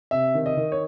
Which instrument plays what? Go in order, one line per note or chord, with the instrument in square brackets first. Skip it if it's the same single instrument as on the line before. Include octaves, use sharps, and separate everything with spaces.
[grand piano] C3 E5
D#3
D#5
D#3
C#5